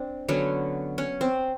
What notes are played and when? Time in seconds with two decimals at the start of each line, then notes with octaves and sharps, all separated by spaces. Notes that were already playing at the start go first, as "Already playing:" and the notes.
Already playing: C4 D4
0.28 D3 F#3 B3 C#4
0.98 C#4
1.21 C4